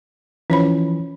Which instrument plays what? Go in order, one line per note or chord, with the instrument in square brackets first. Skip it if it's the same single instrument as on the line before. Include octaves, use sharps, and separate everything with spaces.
[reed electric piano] E3 F3 [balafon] C#4 C#5 B5